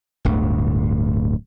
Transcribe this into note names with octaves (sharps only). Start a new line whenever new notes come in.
D1 G1 D2